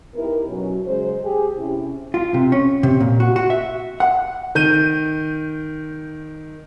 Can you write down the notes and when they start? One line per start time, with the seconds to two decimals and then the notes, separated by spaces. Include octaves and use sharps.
0.14 B3 D#4 E4 G4 A#4
0.48 B2 F#3 C#4
0.85 C#3 F#3 G#3 C5
1.22 G4 G#4
1.56 C3 C#4 E4
2.14 F4
2.34 C3
2.52 C#4
2.83 C3
3.00 A#2
3.20 F#4
3.36 F#4
3.50 E5
4.00 F#5
4.55 D#3 G6 D#7